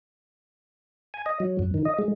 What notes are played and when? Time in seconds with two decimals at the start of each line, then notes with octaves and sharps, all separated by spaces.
1.14 G#5
1.26 D#5
1.40 F#3
1.59 F#2
1.74 D#3
1.85 D#5
1.98 G#3